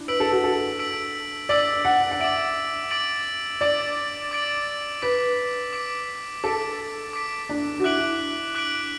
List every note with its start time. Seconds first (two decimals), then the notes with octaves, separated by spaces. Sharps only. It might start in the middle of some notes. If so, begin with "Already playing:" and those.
Already playing: D4 E4
0.08 B4 E6 B6 D7 F#7
0.20 A4
0.32 F#4
0.44 A4
0.79 E6 B6 D7 F#7
1.49 D5 E6 B6 D7 F#7
1.85 F#5
2.00 F#5
2.11 F#5
2.20 E5 D6 A6 D7 F#7
2.91 D6 A6 D7 F#7
3.61 D5 D6 A6 D7 F#7
4.31 D6 A6 D7 F#7
5.02 B4 D6 B6 D7
5.73 D6 B6 D7
6.44 A4 D6 B6 D7
7.13 D6 B6 D7
7.49 D4
7.80 F#4
7.84 E4 D6 F#6 B6 D7 F#7
8.55 D6 F#6 B6 D7 F#7